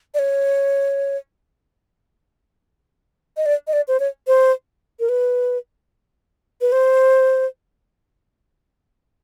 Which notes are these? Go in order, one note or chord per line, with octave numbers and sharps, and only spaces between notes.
D5
C#5
D#5
D5
D#5
D5
C5
C#5
C5
A#4
B4
B4
C5